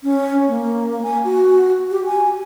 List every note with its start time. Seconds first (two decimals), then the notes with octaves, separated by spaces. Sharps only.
0.03 C#4
0.48 A#3
1.03 G#5
1.25 F#4
1.91 G4
2.05 G#5